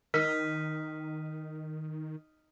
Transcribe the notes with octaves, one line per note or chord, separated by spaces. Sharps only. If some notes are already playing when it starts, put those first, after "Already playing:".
D#3 D#4 A#4 F6 B6